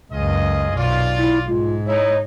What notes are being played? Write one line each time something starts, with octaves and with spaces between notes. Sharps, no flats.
C#2 F#2 F4 G#4 D#5
B1 F4 D5
E4
G#2 G#3 F4
D#4 E4 C#5